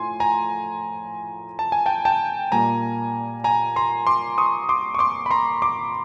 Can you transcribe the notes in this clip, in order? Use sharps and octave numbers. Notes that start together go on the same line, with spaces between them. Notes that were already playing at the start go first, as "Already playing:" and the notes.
Already playing: A2 F3 G#5 C6
G#5 A#5
A5
G#5
G5 A5
G5 A5
A#2 G3 A#3 G#5 A#5
G#5 A#5
A#5 C6
C6 D6
C#6 D#6
C6 D6
C#6
C6 D6
B5
A#5 C6
C6 D6